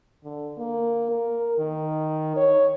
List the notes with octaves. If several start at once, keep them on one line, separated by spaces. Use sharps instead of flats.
D3
A#3
A#4
D#3
C#5